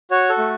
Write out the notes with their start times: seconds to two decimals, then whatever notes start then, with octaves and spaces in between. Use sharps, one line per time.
0.11 F#4 C#5
0.30 A4
0.38 A3